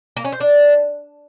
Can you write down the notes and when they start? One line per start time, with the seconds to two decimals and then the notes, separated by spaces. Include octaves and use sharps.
0.17 A#3
0.25 C#4
0.33 C5
0.40 D4